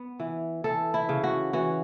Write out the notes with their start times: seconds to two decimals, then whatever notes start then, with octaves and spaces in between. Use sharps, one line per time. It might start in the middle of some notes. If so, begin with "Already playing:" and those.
Already playing: B3
0.20 E3
0.64 E3 A4
0.94 E4
1.09 C#3
1.24 F#4
1.53 E3 F#4